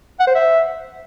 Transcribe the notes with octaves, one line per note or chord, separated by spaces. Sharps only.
F#5
C5
E5